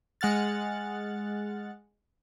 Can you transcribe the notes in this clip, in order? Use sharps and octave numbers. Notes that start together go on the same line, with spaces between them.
G#3 F#5 F6 A6